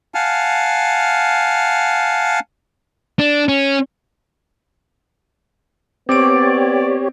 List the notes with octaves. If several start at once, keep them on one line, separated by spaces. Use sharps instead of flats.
F5 F#5 G#5 A5 F6
D4
C#4
B3 C4 G4 C#5 D5 D7